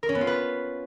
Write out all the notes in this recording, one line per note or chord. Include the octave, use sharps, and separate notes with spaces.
A#4
C#4
B3
F4
B4